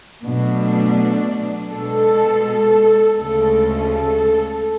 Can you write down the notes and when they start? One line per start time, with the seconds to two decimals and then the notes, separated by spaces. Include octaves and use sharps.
0.23 B2 F#3 A3 D4
1.70 B2 G#3 A4
3.18 D2 C#3 G#3 A4
3.91 A4